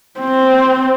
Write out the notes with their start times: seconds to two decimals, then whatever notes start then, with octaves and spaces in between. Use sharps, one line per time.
0.20 C4